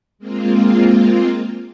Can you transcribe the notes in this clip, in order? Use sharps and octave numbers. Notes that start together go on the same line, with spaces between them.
G#3 A#3 C4 F4